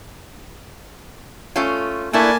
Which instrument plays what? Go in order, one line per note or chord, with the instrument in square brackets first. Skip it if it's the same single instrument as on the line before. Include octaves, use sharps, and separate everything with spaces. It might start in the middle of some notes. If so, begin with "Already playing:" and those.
[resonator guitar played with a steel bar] A3 C#4 F4
[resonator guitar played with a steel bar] A3 D4 E4 [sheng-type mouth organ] A#3 G#5 A5